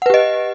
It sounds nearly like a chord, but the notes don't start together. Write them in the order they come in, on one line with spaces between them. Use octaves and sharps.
F#5 B4 G4 D#5